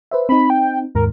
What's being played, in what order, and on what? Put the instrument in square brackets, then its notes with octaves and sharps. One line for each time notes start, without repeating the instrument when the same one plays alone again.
[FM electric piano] B4 C5 E5
[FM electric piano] C4 D#4 [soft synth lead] B5
[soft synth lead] G5
[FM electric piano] D#2 G#2 [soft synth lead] A#4